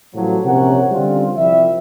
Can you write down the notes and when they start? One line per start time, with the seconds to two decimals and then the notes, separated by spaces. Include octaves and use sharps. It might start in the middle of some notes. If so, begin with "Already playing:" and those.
0.15 A1 A2 F3 F#3
0.45 A#1 C3 C#4 A#4 C#5 F#5
0.91 D3 G3 C4 C#4 F4
1.36 C2 F3 G3 E5